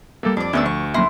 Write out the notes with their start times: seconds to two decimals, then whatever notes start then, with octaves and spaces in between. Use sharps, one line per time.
0.23 G3 A3 A#3 A4
0.37 F2 D4 D5
0.53 D2 G#3 A3 B3 C#4 D4 E6
0.66 F3 C#6
0.94 F#3 A#3 C#4 E4 C6